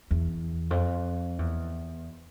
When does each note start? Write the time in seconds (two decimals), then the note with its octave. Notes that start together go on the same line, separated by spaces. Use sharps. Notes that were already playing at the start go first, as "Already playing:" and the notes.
0.11 E2
0.71 F2
1.39 E2